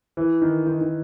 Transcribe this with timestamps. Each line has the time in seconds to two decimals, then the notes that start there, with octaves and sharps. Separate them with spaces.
0.17 E3
0.42 D#3
0.67 D#3
0.81 D#3